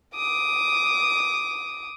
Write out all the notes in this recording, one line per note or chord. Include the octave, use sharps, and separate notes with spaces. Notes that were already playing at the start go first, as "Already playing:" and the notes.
D6 D#6